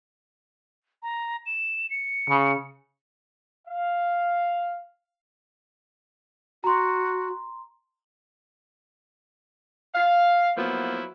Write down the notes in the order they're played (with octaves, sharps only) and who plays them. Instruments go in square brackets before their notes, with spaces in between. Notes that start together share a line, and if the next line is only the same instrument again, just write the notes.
[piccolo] A#5
E7
C#7
[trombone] C#3
[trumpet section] F5
[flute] F#4 [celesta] A#5 C6
[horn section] F5
F3 F#3 A#3 B3 E4